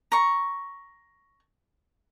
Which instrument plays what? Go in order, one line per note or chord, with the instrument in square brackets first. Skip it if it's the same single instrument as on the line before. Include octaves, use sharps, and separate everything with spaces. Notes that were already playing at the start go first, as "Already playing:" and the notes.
[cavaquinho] A#5 C#6